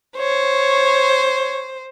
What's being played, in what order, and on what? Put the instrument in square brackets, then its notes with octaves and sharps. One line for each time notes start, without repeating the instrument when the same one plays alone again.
[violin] C5 [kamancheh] C#5